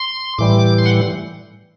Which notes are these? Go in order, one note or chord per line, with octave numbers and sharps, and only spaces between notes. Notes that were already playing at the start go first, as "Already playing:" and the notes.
Already playing: C6
A2 E3 G3 D6
C6
F#5